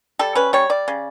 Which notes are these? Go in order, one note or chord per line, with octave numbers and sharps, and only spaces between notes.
G3 A4
C#4 B4
G3 C#5
G3 D5
C#3